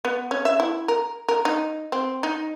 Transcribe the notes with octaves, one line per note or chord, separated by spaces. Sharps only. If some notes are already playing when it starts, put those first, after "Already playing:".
B3
C#4
E5
E4
A#4
A#4
D#4
C4
D#4